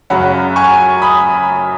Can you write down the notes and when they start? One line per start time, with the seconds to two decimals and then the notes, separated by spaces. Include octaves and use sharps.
0.10 F#2 C#3 F#3 F#5 B5
0.56 G#5 C#6
1.02 B5 D#6